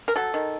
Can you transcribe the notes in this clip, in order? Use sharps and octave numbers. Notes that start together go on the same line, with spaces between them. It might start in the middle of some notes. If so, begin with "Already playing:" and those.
A#4
F#3 A4
D#3